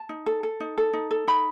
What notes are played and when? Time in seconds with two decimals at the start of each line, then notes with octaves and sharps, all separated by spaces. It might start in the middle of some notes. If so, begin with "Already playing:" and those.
Already playing: A5
0.09 D#4
0.26 A4
0.43 A4
0.60 D#4
0.78 A4
0.93 D#4
1.11 A4
1.27 D#4 B5